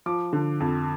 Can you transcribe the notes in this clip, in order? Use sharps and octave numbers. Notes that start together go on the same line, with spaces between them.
F3 D6
D3
F2